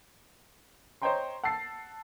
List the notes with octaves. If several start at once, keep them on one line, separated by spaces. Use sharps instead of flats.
C5 C#5 D#5 G5 A#5 C6
F#5 A5 E6 A6 C7